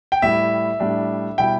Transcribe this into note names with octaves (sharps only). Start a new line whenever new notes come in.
G5
A2 G3 E4 E5
A2 G3 D4
B2 G3 E4 G5